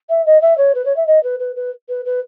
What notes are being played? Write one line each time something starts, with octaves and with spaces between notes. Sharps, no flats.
E5
D#5
E5
C#5
B4
C#5
E5
D#5
B4
B4
B4
B4
B4